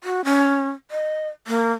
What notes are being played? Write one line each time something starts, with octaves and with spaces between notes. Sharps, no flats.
F#4
C#4
D#5
A#3